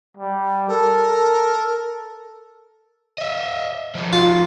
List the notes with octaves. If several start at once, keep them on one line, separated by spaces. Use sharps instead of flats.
G3
A4 A#4
A4
D#5 E5
F3 D#4
F4